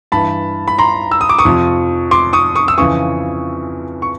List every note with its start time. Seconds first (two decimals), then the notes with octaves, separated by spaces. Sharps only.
0.12 G2 E3 A5 B5
0.68 B5
0.78 A#5 C6
1.11 E6
1.21 D#6
1.29 D6
1.38 C#6 D#6
1.45 F2 C3 F3
2.11 C6 D6
2.33 C#6 D#6
2.55 C#6 D#6
2.68 E6
2.78 F2 C#3 E3 C#6 D#6
4.02 C#6